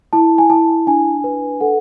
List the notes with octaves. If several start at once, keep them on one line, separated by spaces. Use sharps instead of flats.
E4 A5
G#5
E4 A5
D4 G#5
B4
A4 F#5